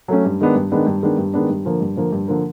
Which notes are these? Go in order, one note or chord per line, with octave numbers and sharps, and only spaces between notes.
F#3 A3 C#4
G2
D#3 G#3 B3 D4
G2
D#3 G#3 B3 D4
G2
D#3 G#3 B3 D4
G2
D#3 G#3 B3 D4
G2
D3 F3 A#3
G2
D3 F3 A#3
G2
D3 F3 A#3